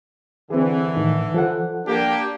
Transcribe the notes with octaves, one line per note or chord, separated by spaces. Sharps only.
D3 E3 C4 G#4
A2 D#3
F3 A4 F#5
A#3 D4 G4